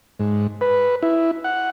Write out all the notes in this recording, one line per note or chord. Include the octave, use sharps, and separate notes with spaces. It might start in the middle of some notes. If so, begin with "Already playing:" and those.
G#2
B4
E4
F#5